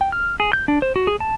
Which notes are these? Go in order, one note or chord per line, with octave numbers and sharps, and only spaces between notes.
G5
F6
G#4
G6
D4
C5
F#4
G#4
A5